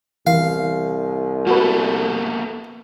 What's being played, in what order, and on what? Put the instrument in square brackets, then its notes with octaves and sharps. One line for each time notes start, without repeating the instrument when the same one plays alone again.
[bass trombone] C2 [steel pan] E3 [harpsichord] F5
[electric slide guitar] A#3 B3 A4 [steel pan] F#4 B4